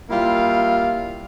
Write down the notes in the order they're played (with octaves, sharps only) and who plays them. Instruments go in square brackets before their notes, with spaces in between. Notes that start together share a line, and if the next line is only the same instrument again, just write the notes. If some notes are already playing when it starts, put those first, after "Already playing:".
[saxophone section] G3 A#3 E4 F4 E5 F5